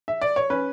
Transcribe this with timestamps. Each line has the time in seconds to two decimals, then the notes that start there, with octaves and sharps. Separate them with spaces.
0.08 E5
0.21 D5
0.36 C#5
0.50 C#4 B4